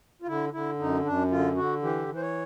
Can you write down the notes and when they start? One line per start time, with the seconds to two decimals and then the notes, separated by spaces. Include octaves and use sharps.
0.22 F4
0.27 D3 E4
0.53 D3 E4
0.80 F#2 D#4
1.05 F#2 D4
1.31 D3 F4
1.56 D3 F#4
1.82 E3 G4
2.08 E3
2.16 C5
2.21 C#5